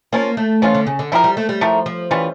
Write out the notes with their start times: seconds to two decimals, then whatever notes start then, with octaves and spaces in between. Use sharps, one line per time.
0.13 F3 A#3 C#4 F4
0.37 A3
0.62 E3 F3 C#4 F4
0.74 D3
0.87 C#3
0.99 D3
1.12 F3 A3 E4 G4 A#4
1.24 G3
1.37 A3
1.49 G3
1.61 F3 A3 E4 G4 A#4
1.86 F3
2.11 E3 G3 C#4 F4